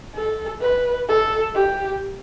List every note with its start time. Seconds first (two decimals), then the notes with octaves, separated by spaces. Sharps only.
0.15 A4
0.61 B4
1.09 A4
1.55 G4